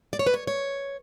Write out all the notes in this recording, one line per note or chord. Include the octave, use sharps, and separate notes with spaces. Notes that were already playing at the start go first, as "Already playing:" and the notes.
D5
C#5
B4
C#5
C#5